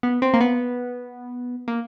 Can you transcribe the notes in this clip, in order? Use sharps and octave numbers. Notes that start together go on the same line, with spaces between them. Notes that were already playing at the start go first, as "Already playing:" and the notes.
B3
C4
A#3
B3
A#3